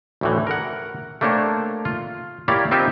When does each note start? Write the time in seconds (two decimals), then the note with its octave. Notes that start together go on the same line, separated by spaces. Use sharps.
0.21 D2 A2 E3
0.47 A#4 F#5
1.21 A3 A#3 D4 C5 C#5 G5
1.85 F4
2.48 A#3 E4 G4 C#5 D5 F5
2.71 C4 D#4 F4 G4 E5 G5